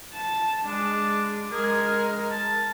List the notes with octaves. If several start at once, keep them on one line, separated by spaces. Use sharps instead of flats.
A5
G#3 D4
G#3 G#4 A#4
A5